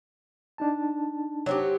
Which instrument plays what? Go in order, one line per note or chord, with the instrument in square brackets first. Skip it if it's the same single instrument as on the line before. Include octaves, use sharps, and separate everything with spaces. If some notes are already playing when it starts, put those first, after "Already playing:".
[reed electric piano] D4 D#4 A5
[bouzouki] F#3 C4 G4